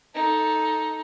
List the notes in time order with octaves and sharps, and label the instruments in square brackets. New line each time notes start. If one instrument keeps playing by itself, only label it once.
[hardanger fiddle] D#4 A4